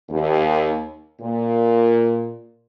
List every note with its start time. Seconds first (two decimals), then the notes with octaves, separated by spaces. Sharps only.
0.10 D#2
1.22 A#2